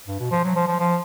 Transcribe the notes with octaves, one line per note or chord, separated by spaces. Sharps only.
G2
B2
F3
F#3
F3
F3
F3